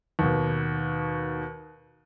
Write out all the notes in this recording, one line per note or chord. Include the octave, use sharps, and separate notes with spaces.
D#2 B2